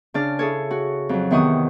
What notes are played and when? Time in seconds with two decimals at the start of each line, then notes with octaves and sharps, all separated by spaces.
0.14 C#3 D4 D5 F6
0.39 E4 G#4 A4 C#5
0.71 F#4
1.09 F2 F#3
1.31 E2 C3 D#3 F#5 C#6 D#6